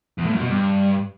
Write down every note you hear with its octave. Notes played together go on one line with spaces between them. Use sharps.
E2
A2
F#2
B2
G2